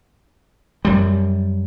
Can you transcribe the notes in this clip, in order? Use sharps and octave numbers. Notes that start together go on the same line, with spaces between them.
F#2 G3